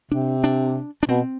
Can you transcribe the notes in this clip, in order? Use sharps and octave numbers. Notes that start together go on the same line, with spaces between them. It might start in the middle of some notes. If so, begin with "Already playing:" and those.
C3 D4
D4
D4
B2 C4